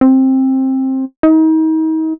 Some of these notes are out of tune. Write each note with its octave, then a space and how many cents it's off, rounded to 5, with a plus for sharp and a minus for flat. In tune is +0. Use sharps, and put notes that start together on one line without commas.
C4 +15
D#4 +35